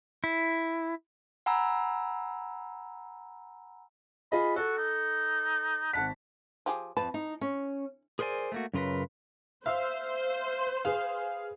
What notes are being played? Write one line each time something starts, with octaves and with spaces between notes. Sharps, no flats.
E4
F#5 G#5 A#5 B5 E6
F4 G#4 D#5 B5
F#4 A4
D#4
G#1 F#5 A5 B6
F3 G4 G#4
F2 B4 A5
D#4
C#4
G#4 A#4 C5 D5 G#5
A3 A#3 F#4
F#2 C#3 F4 A#4 B4
C5 E5 F5 E6
G#4 B4 F5